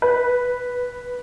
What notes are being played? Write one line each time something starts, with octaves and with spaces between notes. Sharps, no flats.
B4